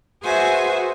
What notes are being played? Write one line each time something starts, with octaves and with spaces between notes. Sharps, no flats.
F#4 G#4 B4 C5 E5 G#5